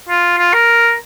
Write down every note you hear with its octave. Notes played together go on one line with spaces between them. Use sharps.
F4
F4
A#4